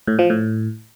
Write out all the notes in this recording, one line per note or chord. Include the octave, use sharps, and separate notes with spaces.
A2
F3
A2